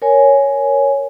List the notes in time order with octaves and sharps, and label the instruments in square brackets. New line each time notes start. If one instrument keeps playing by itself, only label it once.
[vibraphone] A#4 C#5 G#5